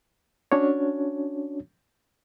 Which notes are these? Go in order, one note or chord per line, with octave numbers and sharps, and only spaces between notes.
C#4 D4 F#4 C#5